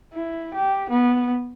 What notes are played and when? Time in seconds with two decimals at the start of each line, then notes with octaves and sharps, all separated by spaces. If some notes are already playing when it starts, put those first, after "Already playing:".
0.14 E4
0.54 G4
0.90 B3